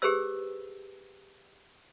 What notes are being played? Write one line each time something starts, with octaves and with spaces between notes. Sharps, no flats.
G4 G#4 B4 C5 E6